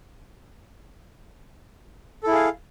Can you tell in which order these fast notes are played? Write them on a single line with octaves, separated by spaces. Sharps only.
A4 E4 G#4 F5